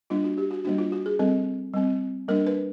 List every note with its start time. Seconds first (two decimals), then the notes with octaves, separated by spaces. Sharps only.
0.10 G3 A#3 D4 F4
0.24 F#4
0.38 G4
0.51 F#4
0.65 G3 A#3 D4 F#4
0.78 F4
0.92 F#4
1.06 G#4
1.19 G3 C4 A4
1.73 G3 C4
2.28 G3 A#3 D4 A#4
2.47 B4